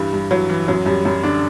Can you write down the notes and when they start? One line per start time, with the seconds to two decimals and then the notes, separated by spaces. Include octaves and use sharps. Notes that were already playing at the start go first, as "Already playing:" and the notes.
Already playing: G2 E3 G3
0.13 G2
0.31 E3 F#3
0.50 E3
0.68 F#2 F#3
0.86 F#2 G3
1.05 F#2 G3
1.23 D3 D4